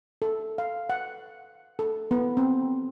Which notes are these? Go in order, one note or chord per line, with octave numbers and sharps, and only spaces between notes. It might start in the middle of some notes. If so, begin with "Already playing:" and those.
A4
F5
F#5
A4
B3
C4